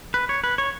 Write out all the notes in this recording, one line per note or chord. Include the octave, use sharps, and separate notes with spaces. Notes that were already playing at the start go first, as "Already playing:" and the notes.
B4
C#5
B4
C#5